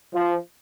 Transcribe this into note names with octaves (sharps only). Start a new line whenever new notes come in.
F3